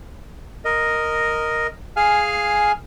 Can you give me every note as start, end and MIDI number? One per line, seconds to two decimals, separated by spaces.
0.65 1.67 70
0.65 1.67 75
1.97 2.72 68
1.97 2.72 77
1.97 2.72 80
1.97 2.72 89